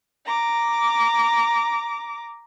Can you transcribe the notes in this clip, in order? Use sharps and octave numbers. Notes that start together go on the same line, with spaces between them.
A#5 D6